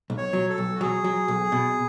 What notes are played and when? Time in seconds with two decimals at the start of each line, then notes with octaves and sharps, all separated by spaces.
0.10 B1
0.17 C#5
0.33 F#3
0.50 A4
0.58 B1
0.75 F#4
0.81 F#3 G#4
1.04 F#3
1.28 B1
1.52 B2